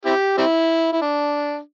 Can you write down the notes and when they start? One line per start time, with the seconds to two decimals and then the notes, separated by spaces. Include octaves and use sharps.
0.05 C4 E4 G4
0.38 G3 C4 E4
0.93 E4
1.02 D4